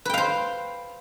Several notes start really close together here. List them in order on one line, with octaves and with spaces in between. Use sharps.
B4 G5 F5 C5